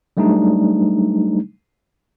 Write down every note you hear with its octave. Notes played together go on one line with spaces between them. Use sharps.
F#3 G3 A3 D4 D#4